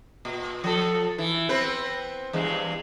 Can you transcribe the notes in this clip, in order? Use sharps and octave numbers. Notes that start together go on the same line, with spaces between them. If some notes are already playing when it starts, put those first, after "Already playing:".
A#2
F3 A4
E3
B3 C4 B4
E2 G2 G#3